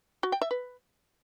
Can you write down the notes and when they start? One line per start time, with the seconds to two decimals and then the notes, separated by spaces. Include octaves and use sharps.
0.23 F#4
0.32 G5
0.42 E5
0.51 B4